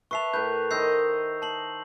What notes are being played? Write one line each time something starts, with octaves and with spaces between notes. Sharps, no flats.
B4 E5 A5 C#6 C7 F7
A2 A#4 B4 G6
D#3 C5 D#5 E6 G6 C7
A5 C7 F#7